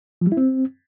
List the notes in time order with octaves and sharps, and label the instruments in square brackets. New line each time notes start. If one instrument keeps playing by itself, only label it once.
[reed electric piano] F3
G3
E4
C4